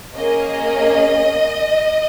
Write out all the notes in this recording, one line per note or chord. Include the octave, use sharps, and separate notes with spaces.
A#3 C#4 G#4 D#5